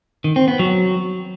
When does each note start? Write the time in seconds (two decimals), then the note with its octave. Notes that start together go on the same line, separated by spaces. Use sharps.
0.24 D#3
0.36 C4
0.48 B3
0.59 F#3